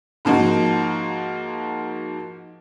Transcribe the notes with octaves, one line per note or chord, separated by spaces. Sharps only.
G#2 F3 A#3 D#4 F#4